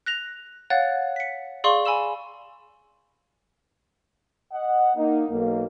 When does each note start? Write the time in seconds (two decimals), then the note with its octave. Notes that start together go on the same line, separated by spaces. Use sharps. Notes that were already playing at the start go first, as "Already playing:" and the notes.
0.06 F#6 A#6 F7
0.70 C#5 F5 F#5 F#6 A6
1.16 B6 C#7
1.64 G#4 D5 F5 C6 C#6 G7
1.85 G#5 B5 E6 E7
4.53 D#5 F#5
4.96 A#3 D#4
5.29 B1 A#3